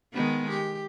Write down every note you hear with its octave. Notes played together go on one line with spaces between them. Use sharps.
D#3 G#3 B3
G4